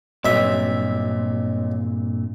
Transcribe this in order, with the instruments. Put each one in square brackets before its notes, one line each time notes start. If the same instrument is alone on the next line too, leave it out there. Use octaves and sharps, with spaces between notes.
[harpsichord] B1 E5 [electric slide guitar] G2 A#2 C4